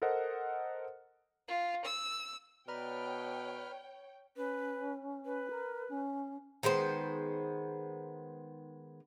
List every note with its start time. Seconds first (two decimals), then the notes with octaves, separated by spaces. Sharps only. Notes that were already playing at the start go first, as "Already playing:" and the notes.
0.02 A4 A#4 C5 D#5 F#5
1.48 F4
1.85 E6
2.68 B2 B4 C#5 D5 G5 A#5 B5 F6
4.36 C#4 B4
5.26 B4
5.50 A#4
5.89 C#4
6.63 D#3 G#3 B3 C5